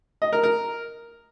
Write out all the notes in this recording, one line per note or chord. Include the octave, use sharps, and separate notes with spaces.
D#5
A#4
A#4